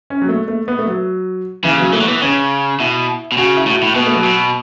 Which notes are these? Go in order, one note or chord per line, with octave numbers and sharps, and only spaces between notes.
C#4
F#3
A3
A3
B3
A3
F#3
C#3 E3
F#3
E3 A3
F#3
E3 B3
C#3 C#4
B2 E4
B2
C#3 F#4
E4
A2
F#4
E4
A2
B2 B3
A3
F#3
B2